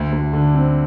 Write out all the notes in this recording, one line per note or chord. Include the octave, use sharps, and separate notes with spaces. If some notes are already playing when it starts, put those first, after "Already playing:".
Already playing: D2
D2
D3
C4